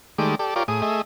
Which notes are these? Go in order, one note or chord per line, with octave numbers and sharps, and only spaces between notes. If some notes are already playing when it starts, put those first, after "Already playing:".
D#3 G#3 A3 G4 D5
G4 A4 D5
F4 G4 A#4 C#5 D5
A2 G#4 D#6
A3 G#4 D#5 E5